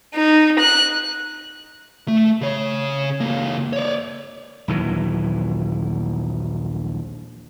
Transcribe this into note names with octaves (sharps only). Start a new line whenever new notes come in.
D#4
F#6
A3
C#3 C#5
C#2 A#3
C#5 D5
A#1 D#2 E3 F#3